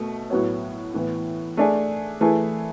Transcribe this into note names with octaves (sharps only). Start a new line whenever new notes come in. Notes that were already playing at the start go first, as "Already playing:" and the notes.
Already playing: B2 A3
A2 F#3 B3 F#4 C#5
A2 E3 B3
A3 D4 G#4
E3 A3 E4 G#4 B4